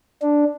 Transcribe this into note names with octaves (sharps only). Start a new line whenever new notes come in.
D4